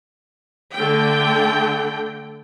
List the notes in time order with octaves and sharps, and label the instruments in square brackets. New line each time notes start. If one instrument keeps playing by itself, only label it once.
[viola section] D3 A3 G5